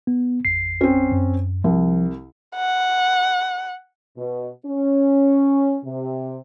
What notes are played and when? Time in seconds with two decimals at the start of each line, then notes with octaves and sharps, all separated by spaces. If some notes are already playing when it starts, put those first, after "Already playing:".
0.07 B3
0.45 A1 F2 C7
0.81 C4 C#4
1.12 F#2
1.64 C2 F3
2.56 F#5
4.18 B2
4.66 C#4
5.85 C3